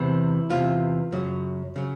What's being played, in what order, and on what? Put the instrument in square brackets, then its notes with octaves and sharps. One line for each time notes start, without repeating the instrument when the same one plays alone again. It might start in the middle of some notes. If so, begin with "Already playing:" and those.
Already playing: [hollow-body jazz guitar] E2 C3 E3 E4
E2 C3 E3 F4
F#2 C#3 F#3
C#3 F#3